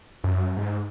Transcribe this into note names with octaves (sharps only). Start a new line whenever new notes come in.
F#2
G#2